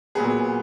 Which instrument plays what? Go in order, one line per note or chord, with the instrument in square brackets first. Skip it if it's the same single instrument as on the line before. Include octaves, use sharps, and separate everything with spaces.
[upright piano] A#2 F#3 B3 G#4